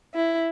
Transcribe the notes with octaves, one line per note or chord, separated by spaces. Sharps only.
E4